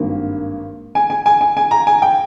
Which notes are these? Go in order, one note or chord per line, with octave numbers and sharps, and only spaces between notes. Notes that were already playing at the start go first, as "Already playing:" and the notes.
Already playing: G#1 G2 D#3 A#3
G#5
G#5
G#5
G#5
G#5
A#5
G#5
G5